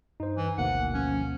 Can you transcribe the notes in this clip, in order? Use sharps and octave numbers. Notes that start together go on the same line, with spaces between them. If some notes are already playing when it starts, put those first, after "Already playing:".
G2 D#4 C5
E3
G#1 D2 B2 A#3 F#5
F3 C#4